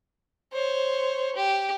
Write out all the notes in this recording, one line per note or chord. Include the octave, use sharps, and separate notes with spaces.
C5 C#5
G4